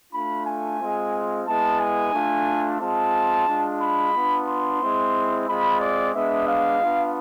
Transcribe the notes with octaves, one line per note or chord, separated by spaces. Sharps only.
A3 D4 F4 B5
G#5
G#3 C4 F4
G#3 B3 E4 A5
G#5
A3 D4 F4
G#3 C4 F4 A5
G#3 D4 F4
B5
B3 D4 F4
C6
G#3 C4 E4
G#3 C4 F4 B5
D5
G#3 B3 D4 E5
F5
B3 D4 F4